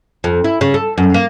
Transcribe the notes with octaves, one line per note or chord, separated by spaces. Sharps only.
F2
E4
C#3
A4
F#2
A#3